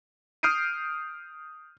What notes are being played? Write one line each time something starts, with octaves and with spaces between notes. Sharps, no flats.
D#6 F6 G6 C7 D7 D#7